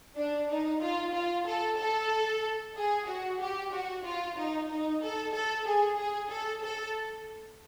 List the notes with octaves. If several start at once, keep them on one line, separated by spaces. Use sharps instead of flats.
D4
D#4
F4
F4
A4
A4
G#4
F#4
G4
F#4
F4
D#4
D#4
A4
A4
G#4
G#4
A4
A4